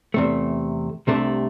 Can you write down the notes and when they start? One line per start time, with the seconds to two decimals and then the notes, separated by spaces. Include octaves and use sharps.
0.14 E2 C3 A3
1.07 C2 C3 A3 D4